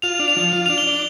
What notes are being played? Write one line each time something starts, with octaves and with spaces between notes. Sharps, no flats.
F4 F7
D4
F7
F3
F4
D4 F7
G7
D4